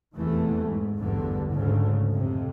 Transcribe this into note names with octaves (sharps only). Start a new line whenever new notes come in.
F1 E2 A#2 E3 A3
G#2
A1 E2 G2 D3
D2 G#2 C#3
F2 C3